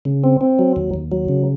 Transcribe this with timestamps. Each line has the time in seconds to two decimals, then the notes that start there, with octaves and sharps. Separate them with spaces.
0.05 C#3
0.24 C4
0.41 C4
0.59 F#3
0.76 D#2
0.94 D#2
1.12 F#3
1.28 C#3